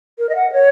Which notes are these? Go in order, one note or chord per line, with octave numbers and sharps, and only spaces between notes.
A#4
D#5
F#5
A#4
C#5